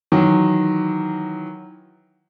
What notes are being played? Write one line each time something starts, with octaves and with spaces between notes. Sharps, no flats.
D#3 E3 F#3